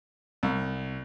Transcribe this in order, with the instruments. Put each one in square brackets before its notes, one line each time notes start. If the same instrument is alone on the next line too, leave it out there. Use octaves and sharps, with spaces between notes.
[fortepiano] C2